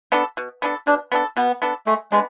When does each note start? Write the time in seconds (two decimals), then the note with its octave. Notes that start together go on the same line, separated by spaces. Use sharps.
0.12 B3 D4 A4
0.37 B2
0.62 B3 D4 A4
0.87 B2 D4
1.12 B3 D4 A4
1.37 B2 B3
1.62 B3 D4 A4
1.87 G#3 A3
2.12 G#3 B3 D4